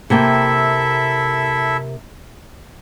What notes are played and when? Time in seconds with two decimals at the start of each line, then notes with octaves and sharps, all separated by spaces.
0.10 C3 A#3 E4 A4 E5 G5